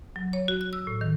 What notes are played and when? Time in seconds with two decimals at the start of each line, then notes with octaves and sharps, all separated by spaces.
0.16 F#3
0.33 C#5
0.48 F#4
0.61 F#6
0.73 E6
0.87 A2
1.01 D#3